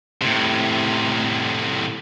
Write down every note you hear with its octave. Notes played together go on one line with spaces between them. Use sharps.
A2 C3